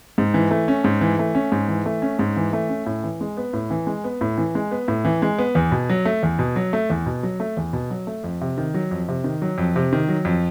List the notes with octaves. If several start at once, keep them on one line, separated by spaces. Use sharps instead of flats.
G#2
E3
A3
C#4
G#2
E3
A3
C#4
G#2
E3
A3
C#4
G#2
E3
A3
C#4
A2
E3
G#3
B3
A2
E3
G#3
B3
A2
E3
G#3
B3
A2
E3
G#3
B3
E2
B2
F#3
A3
E2
B2
F#3
A3
E2
B2
F#3
A3
E2
B2
F#3
A3
F2
C3
D#3
F#3
F2
C3
D#3
F#3
F2
C3
D#3
F#3
F2